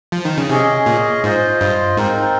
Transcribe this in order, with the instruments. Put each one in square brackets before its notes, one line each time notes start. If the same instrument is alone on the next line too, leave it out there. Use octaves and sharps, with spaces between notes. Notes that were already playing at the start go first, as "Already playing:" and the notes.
[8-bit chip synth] F3
D#3
C#3
[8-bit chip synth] C3 [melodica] C#4 G#4 D#5
[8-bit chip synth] A#2
[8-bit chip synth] G#2 [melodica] F4 C5 D#5
[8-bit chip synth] G2
[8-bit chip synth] G#2 [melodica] C4 D#4 A#4